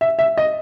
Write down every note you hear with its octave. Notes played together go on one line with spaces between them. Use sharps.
E5
E5
D#5